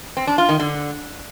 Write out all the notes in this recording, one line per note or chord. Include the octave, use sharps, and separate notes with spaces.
C4
D4
F4
D#3
D3